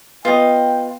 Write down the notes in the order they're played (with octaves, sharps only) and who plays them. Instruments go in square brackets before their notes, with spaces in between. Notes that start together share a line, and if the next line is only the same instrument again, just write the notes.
[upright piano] B3 [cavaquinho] F4 D#5 [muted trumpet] G5